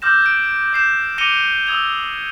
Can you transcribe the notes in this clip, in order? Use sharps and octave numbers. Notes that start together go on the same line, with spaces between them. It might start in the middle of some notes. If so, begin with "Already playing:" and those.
D6 E6 F6 G6 A#6 E7
G#6 D7
G6 C7 E7
D6 A#6 C#7 D#7 F7 G7
D#6 E6 G#6 F7